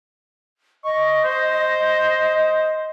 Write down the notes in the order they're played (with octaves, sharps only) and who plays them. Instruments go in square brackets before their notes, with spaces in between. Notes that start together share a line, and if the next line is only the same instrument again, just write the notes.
[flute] D#5 [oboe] C#6
[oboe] C5